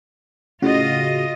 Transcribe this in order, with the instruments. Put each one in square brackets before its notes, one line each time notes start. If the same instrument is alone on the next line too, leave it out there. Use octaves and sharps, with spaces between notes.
[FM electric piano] A2 C#3 F#4 [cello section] F4 D#5